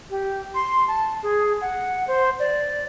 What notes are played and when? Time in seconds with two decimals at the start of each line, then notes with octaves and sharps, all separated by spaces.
0.10 G4
0.55 C6
0.88 A5
1.23 G#4
1.61 F#5
2.07 C5
2.40 D5